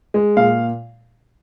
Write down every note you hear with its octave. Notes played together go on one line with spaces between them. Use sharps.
G#3
A#2 F5